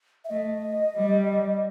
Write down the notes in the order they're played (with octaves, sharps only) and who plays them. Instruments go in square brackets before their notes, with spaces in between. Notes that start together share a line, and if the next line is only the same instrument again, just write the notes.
[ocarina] E5
[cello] A3 [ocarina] D#5
[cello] G3